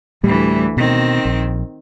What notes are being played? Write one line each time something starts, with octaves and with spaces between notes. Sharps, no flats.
D2 A2 E3 G3
B2 D#3 C4
A#1